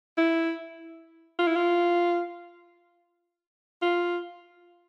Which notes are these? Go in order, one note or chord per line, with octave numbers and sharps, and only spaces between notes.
E4
F4
E4
F4
F4